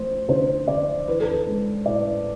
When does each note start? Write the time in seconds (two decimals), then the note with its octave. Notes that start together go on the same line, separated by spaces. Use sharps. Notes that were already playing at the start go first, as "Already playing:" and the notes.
Already playing: F3 A3 C5
0.29 D3 C5
0.68 D3 D5
1.07 E3 B4
1.20 A4
1.31 B4
1.47 G#3
1.86 A2 D5